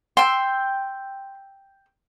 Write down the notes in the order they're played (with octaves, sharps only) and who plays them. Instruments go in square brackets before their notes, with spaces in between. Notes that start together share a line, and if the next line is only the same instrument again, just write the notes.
[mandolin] G5 E6 [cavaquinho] C6